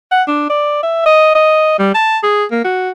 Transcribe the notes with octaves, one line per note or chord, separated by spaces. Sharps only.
F#5
D4
D5
E5
D#5
D#5
G3
A5
G#4
A#3
F#4